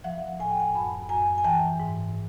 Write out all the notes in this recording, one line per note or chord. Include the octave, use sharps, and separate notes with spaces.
F3 E5 F#5
A2 G#5
G5
F#5 G#5
F#2 A5 B5
F#2 G#5 A#5
G#5
E3 G5 A5
G#2